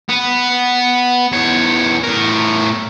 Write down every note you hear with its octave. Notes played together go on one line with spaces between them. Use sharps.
B3
E2 C#5
A2 A#4